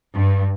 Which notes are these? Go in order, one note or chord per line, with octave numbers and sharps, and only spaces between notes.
G2